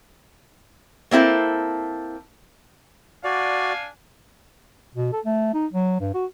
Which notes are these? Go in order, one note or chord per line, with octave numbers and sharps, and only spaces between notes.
A#3 C4 E4 A4
D4 F#4 D5 F5 G#5
B2
A4
A3
D#4
F#3
G2
F#4